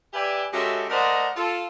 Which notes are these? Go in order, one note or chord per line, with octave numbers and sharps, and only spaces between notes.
G4 B4 D5 E5 G5 G#5
G#3 C#4 F#4 G4 A4 E5
A3 A#4 C5 D5 D#5 F#5
F4 A4